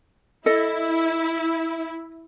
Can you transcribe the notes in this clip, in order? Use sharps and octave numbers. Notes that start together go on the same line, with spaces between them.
E4 A4 D#5